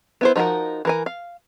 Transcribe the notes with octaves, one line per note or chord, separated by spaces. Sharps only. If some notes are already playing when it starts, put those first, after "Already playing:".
B3 E4 C5
F3 D#4 F#4 G#4 A#4
E3 A#4 G#5
F5